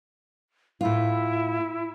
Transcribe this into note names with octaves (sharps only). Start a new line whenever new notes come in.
A2 E4 F4